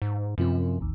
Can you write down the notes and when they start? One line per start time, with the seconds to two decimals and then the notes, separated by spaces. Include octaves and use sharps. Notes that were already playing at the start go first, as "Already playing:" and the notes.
0.02 G#2
0.38 F#2 C3 F3 C4
0.81 A1 D#2